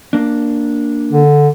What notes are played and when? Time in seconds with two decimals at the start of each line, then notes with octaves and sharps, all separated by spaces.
0.13 A#3 D4
1.13 D3